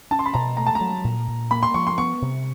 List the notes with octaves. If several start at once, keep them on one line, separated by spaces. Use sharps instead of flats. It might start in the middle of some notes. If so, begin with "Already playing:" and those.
C#4 A5
C6
B5
B2 A#5
A3 A#5
A5
A#5
F#3
A#2
A#2
A#3 B5
C6
F3 C#6
C6
B3 C#6
C3